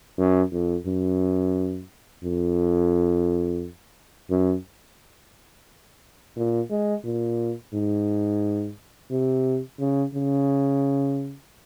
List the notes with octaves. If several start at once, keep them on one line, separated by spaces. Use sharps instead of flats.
F#2
F2
F#2
F2
F#2
A#2
G#3
A#2
G#2
C3
C#3
C#3